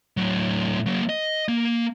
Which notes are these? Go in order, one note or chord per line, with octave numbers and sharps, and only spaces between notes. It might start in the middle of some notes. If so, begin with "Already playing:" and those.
A2 F#3
F#3 A#3
D#5
A#3